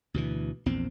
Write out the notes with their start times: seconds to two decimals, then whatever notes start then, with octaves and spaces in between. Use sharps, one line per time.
0.14 D2 B2 E3
0.66 A#1 E2 C4